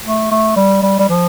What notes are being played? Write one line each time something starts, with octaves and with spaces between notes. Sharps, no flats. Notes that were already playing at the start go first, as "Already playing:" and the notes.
A3
A3
G3
G3
G3
F3